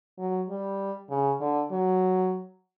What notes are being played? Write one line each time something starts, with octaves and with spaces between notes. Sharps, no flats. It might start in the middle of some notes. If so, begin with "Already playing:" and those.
F#3
G3
C#3
D3
F#3